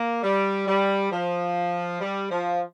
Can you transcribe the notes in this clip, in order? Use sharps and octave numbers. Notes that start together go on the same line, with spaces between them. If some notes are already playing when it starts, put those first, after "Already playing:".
Already playing: A#3
G3
G3
F3
G3
F3